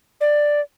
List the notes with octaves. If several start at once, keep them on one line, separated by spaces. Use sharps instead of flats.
D5